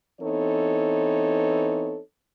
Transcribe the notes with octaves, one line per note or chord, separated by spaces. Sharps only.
E3 B3 C4 D#4 A4 C#5